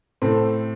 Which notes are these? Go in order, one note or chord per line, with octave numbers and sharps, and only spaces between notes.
A2 A3 C4